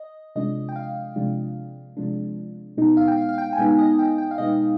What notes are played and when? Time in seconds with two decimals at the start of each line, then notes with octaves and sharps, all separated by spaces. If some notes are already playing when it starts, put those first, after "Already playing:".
Already playing: D#5
0.35 C3 F3 G#3 D4 D#5
0.69 G5
0.76 F5
1.16 C3 F3 G#3 D4
1.97 C3 F3 G#3 D4
2.77 B2 G#3 B3 D#4
2.97 F5
3.08 G5
3.17 F5
3.29 F5
3.38 G5
3.53 G#5
3.58 B2 G#3 B3 D#4 G5
3.79 D#5
3.99 G5
4.18 G5
4.31 F5
4.38 B2 G#3 B3 D#4 D#5